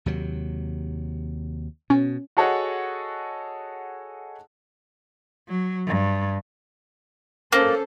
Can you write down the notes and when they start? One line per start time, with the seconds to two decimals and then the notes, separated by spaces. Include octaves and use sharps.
0.06 D#2 C3 F#3
1.90 B2 C#4
2.37 F#4 G#4 A4 C#5 D#5 F#5
5.48 F#3
5.87 G2
7.52 A#3 C#4 A4 C5